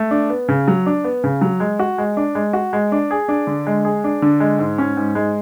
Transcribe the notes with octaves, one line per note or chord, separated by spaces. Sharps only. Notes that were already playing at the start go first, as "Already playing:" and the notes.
Already playing: A3
D4
B3
C#3
F#3
D4
B3
C#3
F#3
G#3
F#4
G#3
D4
G#3
F#4
G#3
D4
G#4
D4
D3
G#3
G#4
D4
D3
G#3
G#2
C#4
G#2
G#3